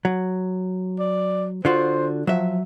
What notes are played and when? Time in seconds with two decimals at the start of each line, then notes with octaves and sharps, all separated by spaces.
0.05 F#3
1.00 D5
1.65 D3 F4 F#4 C5
2.27 F3 F#3 E5